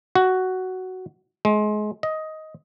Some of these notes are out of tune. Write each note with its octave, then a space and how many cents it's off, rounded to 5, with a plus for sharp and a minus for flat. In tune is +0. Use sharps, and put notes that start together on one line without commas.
F#4 +10
G#3 +25
D#5 +10